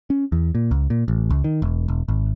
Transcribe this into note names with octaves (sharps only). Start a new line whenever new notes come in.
C#4
E2
A#2
C#2
A#2
A1
C#2
D#3
E1
E1
G#1